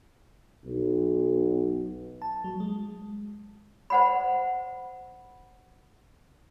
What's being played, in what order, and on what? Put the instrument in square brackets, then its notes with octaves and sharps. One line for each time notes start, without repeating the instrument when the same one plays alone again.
[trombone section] B1
[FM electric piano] A5
F#3
G#3
[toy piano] C5 F#5 B5